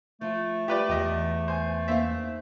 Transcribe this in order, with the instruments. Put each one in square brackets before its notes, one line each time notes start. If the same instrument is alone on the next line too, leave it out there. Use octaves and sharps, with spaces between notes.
[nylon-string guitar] F3 F4 [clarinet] A3
[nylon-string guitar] F4 [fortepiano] G4 B4 D5
[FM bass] E2 [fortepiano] G4 D#5
[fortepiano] C5 G#5
[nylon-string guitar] A#3 D#4 F5 [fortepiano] C4 E5